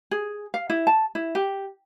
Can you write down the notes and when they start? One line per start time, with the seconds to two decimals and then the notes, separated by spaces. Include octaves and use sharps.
0.11 G#4
0.54 F5
0.70 E4
0.87 A5
1.15 E4
1.35 G4